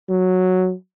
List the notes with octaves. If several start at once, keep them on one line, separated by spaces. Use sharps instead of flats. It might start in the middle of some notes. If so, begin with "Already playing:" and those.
F#3